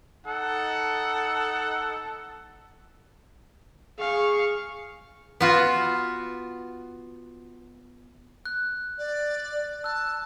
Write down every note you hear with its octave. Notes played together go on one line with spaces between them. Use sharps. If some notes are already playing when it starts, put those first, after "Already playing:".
D#4 A4 F#5
G#4 F5 C#6
B3 F4 F#4
F#6
D5
A5 E6 F#6